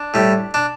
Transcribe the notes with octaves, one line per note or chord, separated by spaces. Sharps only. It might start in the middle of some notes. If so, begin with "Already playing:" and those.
Already playing: D4
A2 G3
D4